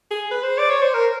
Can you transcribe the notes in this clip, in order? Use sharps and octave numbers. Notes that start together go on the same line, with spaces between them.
G#4
B4
C5
D5
C#5
C5
A#4